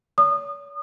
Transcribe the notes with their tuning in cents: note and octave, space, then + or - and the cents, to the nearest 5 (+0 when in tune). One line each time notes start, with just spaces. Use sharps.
C#5 +40 D#6 -30